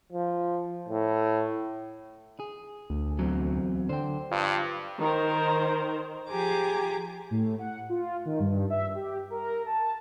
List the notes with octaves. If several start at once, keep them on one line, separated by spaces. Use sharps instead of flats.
F3
A2
G#4
D2
E2 F#3 C4
D3 C5 G5
G2 F4
D#3 A#4 C5
F3 G4 G#4 G#5 A#5 D6
A2
F#5
F4
D#3
G2
E5
G4
A#4
A5